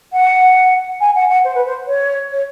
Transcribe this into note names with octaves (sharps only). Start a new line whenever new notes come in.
F#5
G#5
F#5
F#5
C5
B4
C5
C#5
C#5